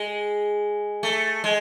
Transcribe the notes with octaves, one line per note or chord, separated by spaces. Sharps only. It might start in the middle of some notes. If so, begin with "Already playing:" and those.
Already playing: G#3
A3
G#3